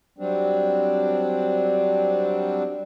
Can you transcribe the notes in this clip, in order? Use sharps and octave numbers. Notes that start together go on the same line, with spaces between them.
F#3 G3 C4 D4